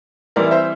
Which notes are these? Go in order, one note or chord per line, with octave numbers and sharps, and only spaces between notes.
E3 G3 C4 E4 A#4 D5
C5 E5